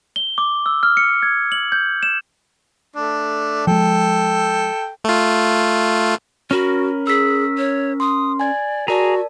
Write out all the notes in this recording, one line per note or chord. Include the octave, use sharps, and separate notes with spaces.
G7
D6
E6
F6
C#7
G#6
F#7
G6
E7
A3 D4
F3 G#3 A4 G5
A3 F4
C#4 F#4 A#4 B5
G#4 E6 B6
C#5
C6 D#6
D5 G#5 G#6
F#4 G#4 A#4 D5 A5 A#5